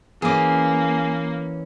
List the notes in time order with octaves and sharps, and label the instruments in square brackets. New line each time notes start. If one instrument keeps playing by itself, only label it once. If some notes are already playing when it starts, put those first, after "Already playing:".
[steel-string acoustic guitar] E3 C#4 [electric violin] A#3 [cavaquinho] G#4 D6